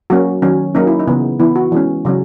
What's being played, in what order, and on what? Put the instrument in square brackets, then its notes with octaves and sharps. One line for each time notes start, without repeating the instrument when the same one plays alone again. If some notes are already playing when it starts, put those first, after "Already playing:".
[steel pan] F#3 A#3 C#4 F#4
D#3 F#3 C#4
F#3 A#3 C#4 D#4
E4
D#4
C#3 E3 B3
E3 B3 E4
F#4
E3 G#3 C#4
C#3 F#3 C#4